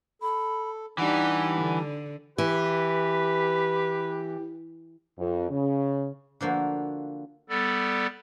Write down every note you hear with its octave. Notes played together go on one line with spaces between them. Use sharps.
A4 B5
E3 G3 D4 D#4 G4 F#5
D3
E3 G4 B4
F2
C#3
D3 F3 A#3 F#4
G3 B3 A4 D5